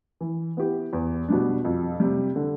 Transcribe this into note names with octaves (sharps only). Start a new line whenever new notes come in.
E3
B3 E4 G4
E2
B2 G3 D4
F2
C3 G3
D3